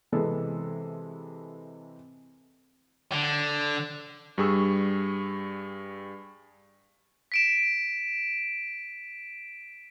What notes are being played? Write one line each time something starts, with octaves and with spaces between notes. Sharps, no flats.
C3 E3 G#3 A4 B4
D3
G2 G3 G#4 C#6 E6
B6 D7 E7